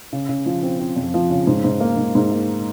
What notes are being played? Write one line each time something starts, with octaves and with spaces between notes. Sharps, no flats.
C#3
C#3
F3
C4
C4
F2
F3
C#3
G#2
G#2
A#3
G#2
G#2
A#3